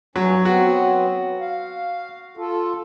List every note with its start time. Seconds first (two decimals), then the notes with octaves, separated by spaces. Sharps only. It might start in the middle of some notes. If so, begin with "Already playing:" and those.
0.16 G2 F#3 C#4
0.45 F#3 B3 C4 F#4
1.40 F5
2.37 F4 A4